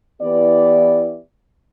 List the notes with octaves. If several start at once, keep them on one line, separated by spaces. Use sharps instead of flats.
E3 B3 E4 G4 D5